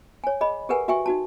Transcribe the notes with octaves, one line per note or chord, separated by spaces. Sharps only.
C#5 G#5
G#4 D#5 B5
G4 G#4 A#4 B4 F#5 G#5
F#4 E5 G5 G#5 C#6
D#4 F#4 A5